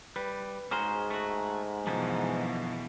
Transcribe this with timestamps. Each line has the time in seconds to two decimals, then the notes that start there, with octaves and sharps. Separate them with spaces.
0.16 G3 B4
0.71 G#2 C#4 F#4 G#4 C5 A#5 F6
1.10 A3 F#4
1.87 F#2 B2 D3 E3 F3 C#4